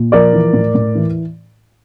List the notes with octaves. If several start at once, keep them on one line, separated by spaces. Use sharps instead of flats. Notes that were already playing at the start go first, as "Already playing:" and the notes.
Already playing: A#2
F3 A#4 D5
E3
A2
A2
E3